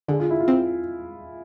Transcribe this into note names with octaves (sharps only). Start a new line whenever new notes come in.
D3 G#4
F4
E4
F4
C4